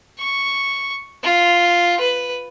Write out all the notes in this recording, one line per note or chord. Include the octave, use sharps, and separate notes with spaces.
C#6
F4
B4